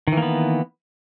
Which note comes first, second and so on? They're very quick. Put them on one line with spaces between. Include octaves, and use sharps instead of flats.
D#3 E3 A#3 B3